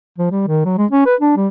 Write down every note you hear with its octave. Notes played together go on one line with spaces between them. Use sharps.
F3
G3
D#3
F#3
G#3
C#4
B4
D4
G3